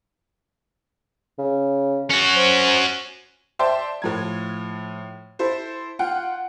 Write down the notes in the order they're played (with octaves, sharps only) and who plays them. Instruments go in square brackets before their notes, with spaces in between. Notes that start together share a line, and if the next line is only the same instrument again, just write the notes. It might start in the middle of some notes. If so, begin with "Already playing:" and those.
[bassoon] C#3
[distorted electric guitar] C#4 F#4
[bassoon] C5
[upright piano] C5 D5 E5 G5 A5 C6
A2 F3 G#6
E4 A4 C5
F4 F#5 G5